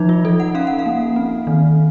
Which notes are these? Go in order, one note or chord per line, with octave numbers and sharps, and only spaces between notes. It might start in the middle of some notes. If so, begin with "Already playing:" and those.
Already playing: F3 D#4
F4
F3 A4
F#5
C#4 F5
F#5
F5
A#3
C4
D#3